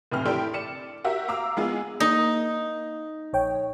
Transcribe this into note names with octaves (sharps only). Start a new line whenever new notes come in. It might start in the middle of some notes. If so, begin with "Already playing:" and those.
F1 A2 E3 C4 F6
D4 E4 G4 A4 G5 C6
D5 C#7 E7
F#4 G4 A#4 E5
F5 A#5 D6 E6
G#3 B3 F4 G#4
A#3 D#4
A#1 C#5 G5